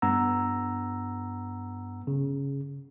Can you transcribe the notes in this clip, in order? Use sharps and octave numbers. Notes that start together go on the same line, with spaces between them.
G2 B3 F#5 A#5 E6
C#3